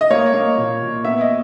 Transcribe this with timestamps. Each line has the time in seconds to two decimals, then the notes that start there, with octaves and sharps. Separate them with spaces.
0.01 D#5
0.11 A#3 C#5
0.34 A#3
0.58 A#2
0.82 A#2
1.05 B3 E5
1.21 D#5